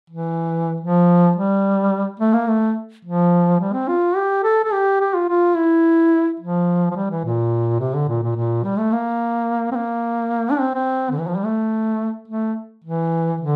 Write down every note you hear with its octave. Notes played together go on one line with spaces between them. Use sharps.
E3
F3
G3
A3
A#3
A3
F3
G3
C4
F4
G4
A4
A4
G4
G4
F4
F4
E4
F3
F3
G3
E3
A#2
C3
D3
A#2
A#2
A#2
G3
A3
A#3
C4
A#3
D4
C4
C4
D3
E3
F3
G3
A3
A3
E3
D3